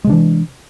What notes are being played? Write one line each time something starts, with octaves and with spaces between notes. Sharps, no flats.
C3 E3 G#3 D4